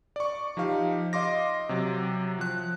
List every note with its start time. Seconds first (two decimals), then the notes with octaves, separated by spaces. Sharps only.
0.16 D5 C#6
0.57 F3 D#4 G4 F5
1.13 D#5 F5 C6 D6 A#6
1.69 C3 F#3
2.39 F3 F#6